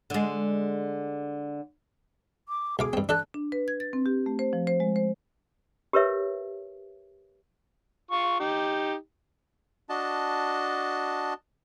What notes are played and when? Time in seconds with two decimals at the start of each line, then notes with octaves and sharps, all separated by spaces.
0.10 D3 G#3
2.49 D6
2.79 B1 G#4 F5 D6
2.93 G2 C4
3.09 D4 A4 A5 F#6
3.34 D4
3.52 B4
3.68 G#6
3.80 A6
3.93 C4
4.06 G4
4.26 A3
4.39 C5
4.53 F3
4.67 C5
4.80 G#3
4.96 C5
5.93 G4 A#4 B4 C#5 E5
8.11 F4 C#6
8.40 D#4 G4
9.89 D4 F#4 D#5 A5